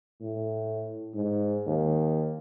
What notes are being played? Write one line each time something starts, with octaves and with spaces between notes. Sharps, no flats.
A2
G#2
D#2